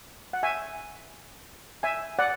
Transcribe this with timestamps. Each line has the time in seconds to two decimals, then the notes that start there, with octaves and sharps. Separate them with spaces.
0.33 F#5
0.43 E5 G#5
1.83 E5 G#5
2.19 D5 F#5